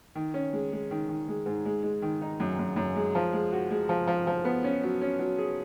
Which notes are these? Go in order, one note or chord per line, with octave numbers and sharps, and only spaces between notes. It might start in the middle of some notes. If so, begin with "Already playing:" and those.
D#3
C#4
G#3
G#3
D#3
D#3
G#3
G#2
G#3
G#3
D#3
D#4
F#2
F#2
F#2
G#3
F3
G#3
F#4
G#3
F3
F3
F3
B3
C#4
F#3
C#4
F#3
G#4